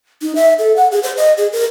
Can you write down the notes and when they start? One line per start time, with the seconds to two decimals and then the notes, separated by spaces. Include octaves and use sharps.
0.22 D#4
0.36 E5
0.59 A4
0.76 F#5
0.92 G#4
1.03 C5
1.17 D#5
1.37 G#4
1.53 A#4